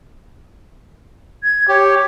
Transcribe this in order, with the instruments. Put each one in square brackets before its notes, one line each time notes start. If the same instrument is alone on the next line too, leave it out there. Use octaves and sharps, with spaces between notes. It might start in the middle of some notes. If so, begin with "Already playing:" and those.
[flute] G#6
[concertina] G4 [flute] C#5